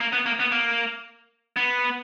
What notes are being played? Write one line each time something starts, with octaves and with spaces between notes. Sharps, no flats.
A#3
B3
A#3
B3
A#3
B3